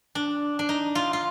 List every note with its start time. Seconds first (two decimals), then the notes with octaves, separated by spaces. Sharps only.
0.15 D4
0.59 D4
0.69 D#4
0.95 F4
1.13 F4